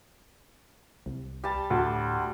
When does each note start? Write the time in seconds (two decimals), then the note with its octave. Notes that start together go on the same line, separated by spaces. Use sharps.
1.06 C2
1.44 G3 A5
1.70 D2 A2